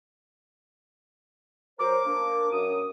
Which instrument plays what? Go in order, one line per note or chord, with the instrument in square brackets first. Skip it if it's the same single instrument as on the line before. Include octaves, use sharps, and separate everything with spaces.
[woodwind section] F#3 A#4 C5 [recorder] D6
[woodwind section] A#3 D4
F#2 D#6